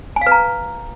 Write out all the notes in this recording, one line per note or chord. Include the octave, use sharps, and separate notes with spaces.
G#5
F5
B4
A#5